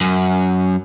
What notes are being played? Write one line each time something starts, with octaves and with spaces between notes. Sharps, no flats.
F#2